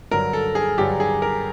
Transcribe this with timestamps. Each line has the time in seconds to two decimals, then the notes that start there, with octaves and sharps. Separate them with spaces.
0.11 G2 D3 F#3 A#4
0.33 A4
0.55 G#4
0.78 G2 D3 F#3 G4
1.00 G#4
1.22 A#4